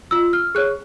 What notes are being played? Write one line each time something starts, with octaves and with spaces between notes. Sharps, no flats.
F4 E6
F6
G#4 C#5 F#6